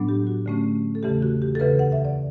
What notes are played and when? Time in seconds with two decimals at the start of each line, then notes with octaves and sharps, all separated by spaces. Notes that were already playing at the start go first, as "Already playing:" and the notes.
Already playing: A2 F#3 B3 D4
0.09 G4
0.27 F#4
0.46 D3 A3 C#4
0.95 A4
1.03 E2 C#3 E3 A3 G4
1.22 F#4
1.42 G4
1.55 A4
1.59 D2 C#3 E3 B4
1.79 F#5
1.92 E5
2.05 D5